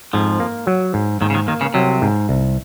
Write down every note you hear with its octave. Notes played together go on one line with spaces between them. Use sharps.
F2 G#2 F3
A#3
F#3
G#2
D#2 G#2 D#3
C#3
D#2 D#3
D#2 D#3 A#3
C#2 C#3
C2 C3 F#3
G#2
C2